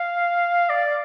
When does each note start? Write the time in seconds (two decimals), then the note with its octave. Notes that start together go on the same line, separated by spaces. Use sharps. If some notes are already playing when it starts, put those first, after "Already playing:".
Already playing: F5
0.69 D5